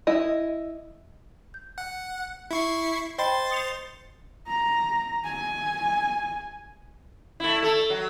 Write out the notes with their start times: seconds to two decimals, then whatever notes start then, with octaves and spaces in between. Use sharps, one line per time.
0.07 E4 D#5
1.54 G6
1.78 F#5
2.51 E4 C#6 C7
3.18 C5 D#5 G5 B5 C6 A6
3.51 D#6 C#7 F7
4.48 A#5
5.25 G#5
7.40 A3 E4
7.62 A3 A4
7.90 F#3